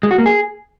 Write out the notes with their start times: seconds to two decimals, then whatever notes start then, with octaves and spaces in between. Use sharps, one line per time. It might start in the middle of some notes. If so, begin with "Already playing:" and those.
0.03 G#3
0.11 F#4
0.18 A#3
0.26 G#4